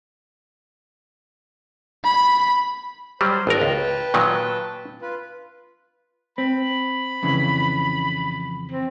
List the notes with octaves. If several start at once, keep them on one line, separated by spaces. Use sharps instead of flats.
B5
F#3 G3 C5
G#1 A#4 B4 G5 A5
C#2
A#2 D#3 F#3
F4 B4
C4 B5
F2 C#3 E3
C4